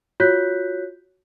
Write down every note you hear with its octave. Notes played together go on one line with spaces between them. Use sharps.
F4 F#4 C#5 F#6 G6 B6